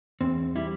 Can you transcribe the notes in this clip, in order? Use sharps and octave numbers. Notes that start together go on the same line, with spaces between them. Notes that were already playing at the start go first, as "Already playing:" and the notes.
E2 C4
G3 E4